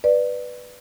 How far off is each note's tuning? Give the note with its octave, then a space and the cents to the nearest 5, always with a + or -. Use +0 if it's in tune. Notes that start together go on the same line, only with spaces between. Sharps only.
B4 +0 D5 +15